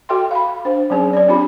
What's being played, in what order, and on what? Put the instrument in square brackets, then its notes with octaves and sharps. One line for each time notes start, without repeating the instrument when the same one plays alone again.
[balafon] F#4 A4 E5 G5 C6
F5 B5
D4 C5
F#3 C4 C#4 G#4
C#5 D5
C4 D4 F4 G4 B5